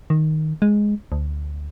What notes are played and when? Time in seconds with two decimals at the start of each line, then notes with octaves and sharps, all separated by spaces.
0.10 D#3
0.62 G#3
1.12 D2